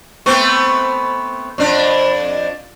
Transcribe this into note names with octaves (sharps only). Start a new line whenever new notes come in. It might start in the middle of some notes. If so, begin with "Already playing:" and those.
A3 B3 C4
F2 D4